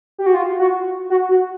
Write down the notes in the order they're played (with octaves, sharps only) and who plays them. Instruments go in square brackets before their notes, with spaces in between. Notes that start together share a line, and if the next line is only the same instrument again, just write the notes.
[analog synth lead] G4
F#4
F4
F#4
F#4
F#4